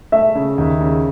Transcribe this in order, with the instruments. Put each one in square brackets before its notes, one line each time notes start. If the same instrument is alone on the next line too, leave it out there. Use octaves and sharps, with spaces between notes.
[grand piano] A3 [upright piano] E5
[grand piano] C#3
D#2
C#3